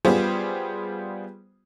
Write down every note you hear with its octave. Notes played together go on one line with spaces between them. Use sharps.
G3 B3 F4 G4 G#4 C5